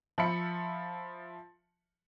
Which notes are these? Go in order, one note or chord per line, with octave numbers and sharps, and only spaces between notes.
F3 E5 B5 C#7